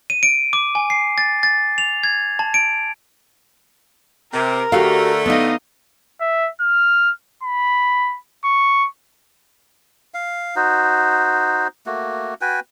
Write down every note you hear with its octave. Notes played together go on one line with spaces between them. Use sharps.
D#7
D7
D6
G#5
C7
A6
A6
F7
G#6
A5
D7
C3 A#4
D3 A3 F#4 G4 F5
B3 D#4 D#5 F5
E5
F6
B5
C#6
F5
D#4 F#4 C5
A3 A#3 F#4
F#4 B4 G5 G#5